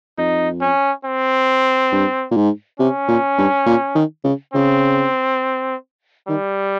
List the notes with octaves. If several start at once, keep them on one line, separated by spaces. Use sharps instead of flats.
F2 D#4
C#4
C4
G2
A#2
G#2
C3 C#4
A#2
G2
A#2
D#3
C#3
C#3 C4
D#3 G3